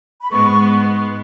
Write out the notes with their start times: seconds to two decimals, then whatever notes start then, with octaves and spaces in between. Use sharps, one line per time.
0.21 B5
0.30 G#2 G#3 B3 C#6